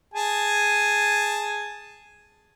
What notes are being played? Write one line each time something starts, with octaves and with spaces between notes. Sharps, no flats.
G#4 G#5 A5